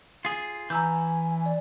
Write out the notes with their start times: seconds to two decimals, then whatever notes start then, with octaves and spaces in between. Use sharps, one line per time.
0.25 F4 G#4
0.70 E3 G#5 A#5 E6 G6
1.46 D5